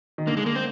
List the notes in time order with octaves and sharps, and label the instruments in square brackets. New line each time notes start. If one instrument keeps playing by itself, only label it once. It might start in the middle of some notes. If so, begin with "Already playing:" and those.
[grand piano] D#3
[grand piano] D3 [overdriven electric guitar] A#3
[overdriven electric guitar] G#3
A#3
C4